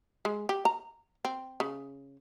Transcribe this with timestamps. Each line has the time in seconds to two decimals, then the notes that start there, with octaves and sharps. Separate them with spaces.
0.25 G#3
0.49 G4
0.65 A#5
1.25 C4
1.60 C#3